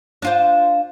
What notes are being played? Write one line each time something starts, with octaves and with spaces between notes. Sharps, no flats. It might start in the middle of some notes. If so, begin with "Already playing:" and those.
D4 F4 C5